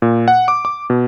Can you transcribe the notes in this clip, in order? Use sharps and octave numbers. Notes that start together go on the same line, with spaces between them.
A#2
F#5
D6
D6
B2